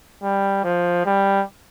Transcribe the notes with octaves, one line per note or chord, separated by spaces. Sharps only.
G3
F3
G3